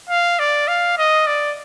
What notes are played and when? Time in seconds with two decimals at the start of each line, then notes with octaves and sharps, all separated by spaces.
0.09 F5
0.39 D5
0.68 F5
0.98 D#5
1.27 D5